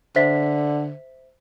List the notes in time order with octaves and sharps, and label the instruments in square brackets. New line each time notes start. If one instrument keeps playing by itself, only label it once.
[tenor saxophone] D3 [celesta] C5 E5 B6